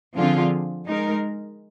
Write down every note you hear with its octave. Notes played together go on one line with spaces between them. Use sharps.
D3 F3 C4 F4 G#4
G#3 D#4 A#4